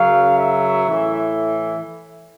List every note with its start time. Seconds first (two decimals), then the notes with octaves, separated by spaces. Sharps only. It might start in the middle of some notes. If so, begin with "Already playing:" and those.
Already playing: F#2 C#3 F#3 F5
0.38 E5
0.86 A2 E3